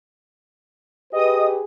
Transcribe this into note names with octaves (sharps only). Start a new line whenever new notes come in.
G4 G#4 B4 D#5 D#6